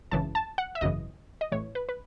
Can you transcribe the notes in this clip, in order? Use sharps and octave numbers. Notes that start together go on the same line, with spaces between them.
G#1 F#2 C#3 E3 A5
A5
F#5
E5
G#1 F#2 C#3 E3 D#5
D#5
A1 A2 E3 C#5
B4
B4